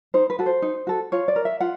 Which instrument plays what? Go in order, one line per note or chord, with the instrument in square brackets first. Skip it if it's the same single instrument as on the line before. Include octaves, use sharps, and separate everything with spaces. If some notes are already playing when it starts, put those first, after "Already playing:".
[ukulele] D#4 C5
B4
F#4 A4
C5
D#4
F#4 A4
F4 C#5
D5
A#4
E5
F4 F#5